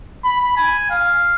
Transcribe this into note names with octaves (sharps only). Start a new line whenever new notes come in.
B5
G#5
F5